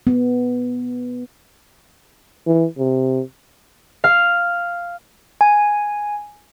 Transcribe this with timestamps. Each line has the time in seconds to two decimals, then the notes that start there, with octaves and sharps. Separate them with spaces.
0.07 B3
2.47 E3
2.78 C3
4.04 F5
5.41 G#5